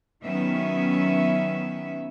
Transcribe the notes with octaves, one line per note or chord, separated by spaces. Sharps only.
D#3 F#3 B3 C#4 E5